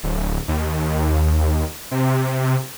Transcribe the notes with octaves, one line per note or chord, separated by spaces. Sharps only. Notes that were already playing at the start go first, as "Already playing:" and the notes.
D1
D#2
C3